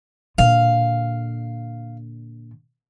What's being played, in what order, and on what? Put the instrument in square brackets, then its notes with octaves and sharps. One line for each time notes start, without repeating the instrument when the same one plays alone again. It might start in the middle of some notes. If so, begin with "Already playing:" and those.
[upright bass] A#2 D3 [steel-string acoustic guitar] F5